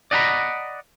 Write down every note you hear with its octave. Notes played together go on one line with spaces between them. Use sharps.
D5 D#5 F#5 G#5 A#5 B5